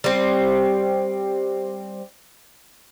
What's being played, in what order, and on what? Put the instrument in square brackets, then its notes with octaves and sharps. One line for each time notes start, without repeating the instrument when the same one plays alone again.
[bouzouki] G3 C4